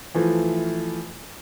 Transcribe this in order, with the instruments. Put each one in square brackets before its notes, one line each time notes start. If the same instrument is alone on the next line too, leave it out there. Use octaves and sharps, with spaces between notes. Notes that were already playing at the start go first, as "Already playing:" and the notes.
[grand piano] E3 F3 A3